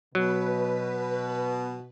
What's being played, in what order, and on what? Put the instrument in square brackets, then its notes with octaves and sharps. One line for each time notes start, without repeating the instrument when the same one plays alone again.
[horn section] B2 [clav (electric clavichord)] F#3 [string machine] B4